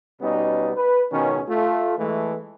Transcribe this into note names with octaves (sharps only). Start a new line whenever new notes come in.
B2 G3 B3 C#4 D#4
B4
C#2 B2 D#3 C#4
A3 F4
E3 G#3 A3